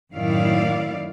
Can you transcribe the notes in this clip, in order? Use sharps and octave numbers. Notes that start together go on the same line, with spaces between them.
F#2 A2 D#3 E4 D5 F5